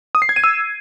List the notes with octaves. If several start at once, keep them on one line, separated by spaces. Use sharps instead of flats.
D#6
C7
G#6
D#7
E6